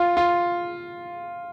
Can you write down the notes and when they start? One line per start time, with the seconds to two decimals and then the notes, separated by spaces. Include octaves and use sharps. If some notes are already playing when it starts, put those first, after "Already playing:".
Already playing: F4
0.17 F4